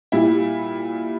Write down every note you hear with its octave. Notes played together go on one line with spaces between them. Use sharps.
A#2 G3 E4